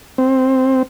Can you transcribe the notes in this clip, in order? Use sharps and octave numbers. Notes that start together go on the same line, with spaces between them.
C4